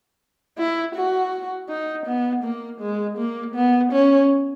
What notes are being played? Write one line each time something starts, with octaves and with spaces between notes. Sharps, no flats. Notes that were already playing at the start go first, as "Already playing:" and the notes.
E4
F#4
D#4
B3
A#3
G#3
A#3
B3
C#4